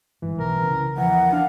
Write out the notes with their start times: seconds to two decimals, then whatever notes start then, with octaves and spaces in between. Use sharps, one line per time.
0.22 G#1 G2 E3
0.38 B1 A#4
0.61 C2 C#3
0.97 E2 E3 F3 A#4 F#5
1.32 D4 F5